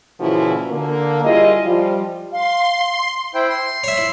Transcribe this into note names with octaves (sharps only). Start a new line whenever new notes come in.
A#2 C#3 E3 F3 E4 F#4
D3 A#3
G3 E4 F4 G#4 D#5
F3 G3 F4
F5 C6
E4 C5 G5
C6
C#5 E5
E4